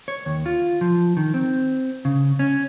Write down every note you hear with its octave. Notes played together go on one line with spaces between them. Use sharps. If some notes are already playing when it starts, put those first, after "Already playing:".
C#5
D#2
F4
F3
D#3
C4
C#3
C#4